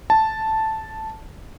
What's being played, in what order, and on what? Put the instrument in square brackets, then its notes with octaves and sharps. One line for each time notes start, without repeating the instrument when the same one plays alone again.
[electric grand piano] A5